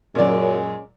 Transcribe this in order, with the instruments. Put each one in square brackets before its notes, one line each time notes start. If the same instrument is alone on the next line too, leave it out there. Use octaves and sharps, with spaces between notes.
[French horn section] F#2 [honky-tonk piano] A#2 F#3 [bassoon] G#3 [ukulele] C#4 D5